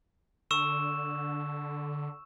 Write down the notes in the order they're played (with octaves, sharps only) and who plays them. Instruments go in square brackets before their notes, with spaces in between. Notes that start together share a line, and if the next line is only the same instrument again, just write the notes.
[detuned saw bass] D3 [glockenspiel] C#6 E6 E7